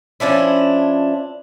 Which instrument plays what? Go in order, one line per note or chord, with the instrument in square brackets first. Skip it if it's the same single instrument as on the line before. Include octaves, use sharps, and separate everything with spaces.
[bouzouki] F3 C#4 D4 E4